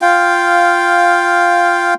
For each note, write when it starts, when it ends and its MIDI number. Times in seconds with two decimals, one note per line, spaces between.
0.02 1.94 65
0.02 1.94 77
0.02 1.94 79